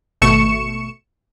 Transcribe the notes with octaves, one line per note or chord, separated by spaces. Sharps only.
G#1 B2 A3 C#6 C#7 E7